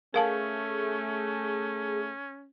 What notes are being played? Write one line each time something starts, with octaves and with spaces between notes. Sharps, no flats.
A3 C#4 G#4 A#4 F5 A5